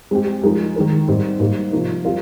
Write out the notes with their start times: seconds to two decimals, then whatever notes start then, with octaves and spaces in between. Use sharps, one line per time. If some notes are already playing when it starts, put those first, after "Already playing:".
0.11 G#3 C4 G4
0.43 F3 G#3 D#4 A#4
0.76 D#3 G#3 D#4 A#4
1.08 G#2 G3 C4
1.40 G#2 G3 A#3
1.72 C3 F3 A#3 D#4
2.05 G3 C4 F4 A#4